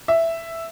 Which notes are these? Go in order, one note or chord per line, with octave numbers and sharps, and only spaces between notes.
E5